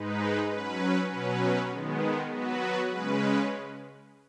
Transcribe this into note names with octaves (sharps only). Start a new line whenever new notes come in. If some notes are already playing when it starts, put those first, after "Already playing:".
Already playing: G#2 G#3 D#4 B4
F#3 C#4 B4
B2 F#3 C#4 B4
D#3 G#3 B3
F#3 B3 F#4 B4
C#3 G#3 C#4 B4